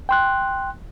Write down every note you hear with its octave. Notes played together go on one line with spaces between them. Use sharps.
G5 C6 F#6